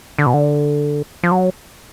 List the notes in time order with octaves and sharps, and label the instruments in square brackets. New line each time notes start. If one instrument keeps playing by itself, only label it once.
[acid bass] D3
B2
D3
F3
F#3